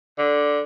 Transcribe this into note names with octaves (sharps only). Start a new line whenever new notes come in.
D3